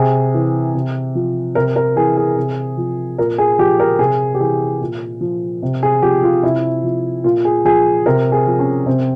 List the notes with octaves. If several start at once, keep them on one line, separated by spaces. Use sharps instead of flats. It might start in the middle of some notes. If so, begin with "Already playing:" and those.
Already playing: C3 G#4
E3
C3
F3
C3 A#4
A#4
E3 G#4
G#4
C3
F3
A#2 A#4
G#4
F3 G4
A#4
C3 G#4
G4
E3 G#4
A#2
F3
C3
G#4
F3 G4
F4
C3 E4
F3
A#2 F4
G#4
F3 G#4
C3 A#4
G#4
F3
C#4
C3 C4